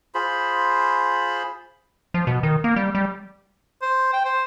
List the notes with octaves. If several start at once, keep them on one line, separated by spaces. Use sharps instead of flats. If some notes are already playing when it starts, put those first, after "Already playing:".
F4 G#4 C5 B5
F3
B2
D#3
A#3
G3
G3
C5
G5
C5